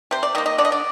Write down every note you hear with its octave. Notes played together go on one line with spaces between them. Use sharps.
C3 C5
D5
D#3 A#3 D#5
D#5
D3 D5
D#5
D5